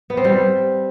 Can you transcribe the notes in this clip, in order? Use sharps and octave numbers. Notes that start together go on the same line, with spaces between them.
B3
C4
G3